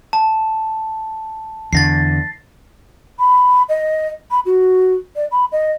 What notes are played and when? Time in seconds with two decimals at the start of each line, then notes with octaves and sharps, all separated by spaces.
0.13 A5
1.73 E2 D3 A6 A#6 C7
3.19 B5
3.69 D#5
4.31 B5
4.46 F#4
5.16 D5
5.32 B5
5.52 D#5